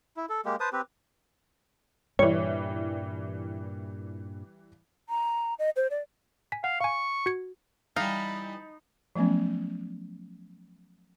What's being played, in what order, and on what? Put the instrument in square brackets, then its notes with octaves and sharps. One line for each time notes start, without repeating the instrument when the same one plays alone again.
[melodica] E4
A4
G#3 A#3 G4
B4 C5 A5 D#6
C4 G4 B4
[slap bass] G2 A#2 [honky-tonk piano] E3 G3 [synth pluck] C#5
[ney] A#5
D#5
C5
D5
[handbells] G#5 B6
[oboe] F5 [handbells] F#5
[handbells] F5 G#5 [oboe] C#6
[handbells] F#4 G#6 C#7
[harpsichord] E3 G3 [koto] D#4 [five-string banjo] F5 [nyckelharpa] A5 B5
[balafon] F3 F#3 A3 B3 C#4